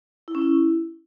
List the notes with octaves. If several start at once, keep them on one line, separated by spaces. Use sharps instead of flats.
E4
C#4
E4